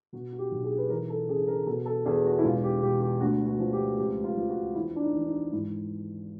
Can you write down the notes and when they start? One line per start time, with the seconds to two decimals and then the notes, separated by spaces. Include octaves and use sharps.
0.13 B2 F#4
0.32 F#4
0.39 G4
0.51 B1
0.65 G#4
0.78 B4
0.89 E3 A#4
1.10 A4
1.28 C#3 G#4
1.47 A#4
1.66 B2 A4
1.86 A4
2.06 E2 G#4
2.25 F#4
2.38 E4
2.43 E1 F4
2.63 G4
2.82 B2 G4
3.02 G4
3.21 D2 F#4
3.46 F#4
3.59 F3
3.73 G4
3.98 C#2 G4
4.24 F4
4.36 F3
4.49 F#4
4.75 E2 E4
4.96 D4
5.02 D#4
5.14 E3
5.26 D#4
5.52 G#1 E4